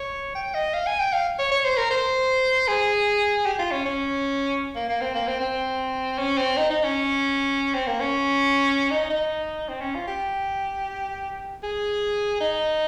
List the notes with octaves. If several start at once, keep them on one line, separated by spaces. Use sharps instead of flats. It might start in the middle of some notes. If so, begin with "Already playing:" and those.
Already playing: C#5
G5
D#5
F5
G#5
G5
F5
C#5
C#5
C5
A#4
C5
G#4
G4
F4
C#4
C#4
A#3
A#3
C4
A#3
C4
C4
C#4
C4
D#4
D#4
C#4
C4
A#3
C#4
D#4
D#4
C4
C#4
F4
G4
G#4
D#4